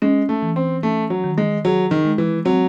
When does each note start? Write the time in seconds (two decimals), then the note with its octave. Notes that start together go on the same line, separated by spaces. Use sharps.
0.02 G#3 C#4
0.29 A3
0.42 E3
0.56 C4
0.83 A3 C#4
1.10 F#3
1.24 D#3
1.38 G#3
1.65 F#3 G#4
1.91 D#3
2.05 G#3
2.18 E3
2.45 F#3 C4